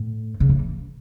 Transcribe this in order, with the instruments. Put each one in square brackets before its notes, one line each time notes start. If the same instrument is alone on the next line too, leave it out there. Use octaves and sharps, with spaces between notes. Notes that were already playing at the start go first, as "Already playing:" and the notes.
Already playing: [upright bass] A2
C#3
E3